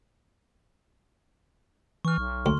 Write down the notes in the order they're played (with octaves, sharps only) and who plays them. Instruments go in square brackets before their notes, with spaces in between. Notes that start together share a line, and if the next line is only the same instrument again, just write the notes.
[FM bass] E3 [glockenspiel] C#6 F6
[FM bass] B1
[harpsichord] D2 [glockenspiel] C6